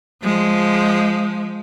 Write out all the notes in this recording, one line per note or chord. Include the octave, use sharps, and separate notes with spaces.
F3 G#3